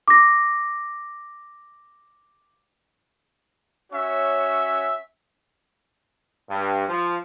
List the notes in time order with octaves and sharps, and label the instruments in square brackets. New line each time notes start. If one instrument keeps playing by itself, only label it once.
[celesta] D6 A#6
[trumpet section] C#4 F#4 C#5 E5
[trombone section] G2
F3